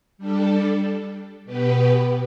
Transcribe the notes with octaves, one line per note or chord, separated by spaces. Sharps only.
G3 D4 A4
B2 B3 G4 B4